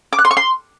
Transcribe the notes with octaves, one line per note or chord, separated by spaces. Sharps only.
D6
F#6
C6
C#6
C6